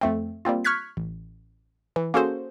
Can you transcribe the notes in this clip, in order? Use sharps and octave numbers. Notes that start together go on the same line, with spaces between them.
F2 A3 C4
G3 A#3 C4 F4
C#6 F6 F#6 G#6 B6
A1
E3
A#3 C#4 F#4 G#4 A4 C5